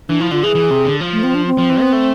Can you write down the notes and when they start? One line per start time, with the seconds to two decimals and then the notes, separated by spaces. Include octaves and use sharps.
0.09 E3 D4
0.21 F3 E4
0.31 D3 F4
0.43 E3 G#4
0.55 E3
0.70 C3
0.85 D3
1.01 F3
1.12 A3
1.23 C4
1.35 D4
1.47 C4
1.58 F3
1.69 E3
1.81 B3
1.93 A3